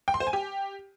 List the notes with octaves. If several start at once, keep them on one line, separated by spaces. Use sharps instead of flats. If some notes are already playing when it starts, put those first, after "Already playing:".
G5
C6
C5
G#5
G4